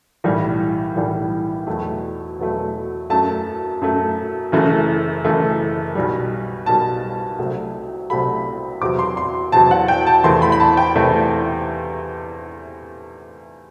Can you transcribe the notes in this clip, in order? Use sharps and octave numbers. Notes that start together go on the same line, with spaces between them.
B1 A2 E3 G3
B1 A2 E3 G3
E2 B2 F#3 A3
E2 B2 F#3 A3
F#2 F#3 A3 A5
F#2 F#3 A3
F#1 F#2 E3 A3
F#1 F#2 E3 A3
B1 B2 G3
B1 B2 G3 A5
C2 C3 F#3 A3
C2 C3 F#3 A3 B5
E2 C3 F#3 D6
C6
C6
E2 C3 F#3 A5
F#5
G5
A5
E2 C3 E3 A3 C6
B5
B5
A5
G5
E2 C3 E3 A3